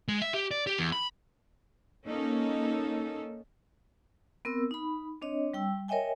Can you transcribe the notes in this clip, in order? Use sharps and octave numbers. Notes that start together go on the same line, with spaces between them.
G#3
E5
G4
D5
G4
E2
B5
A#3 C#4 D#4 A4
B3 C4 A#4 E6
D#4 B5
C4 D4 C#5 D#5
G3 G5 E6
A#4 C#5 D#5 E5 G5 G#5